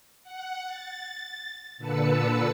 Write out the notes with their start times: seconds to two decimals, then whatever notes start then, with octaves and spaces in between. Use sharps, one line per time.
0.23 F#5
0.67 A6
1.78 A#2 D3 B4 A5 E6 C#7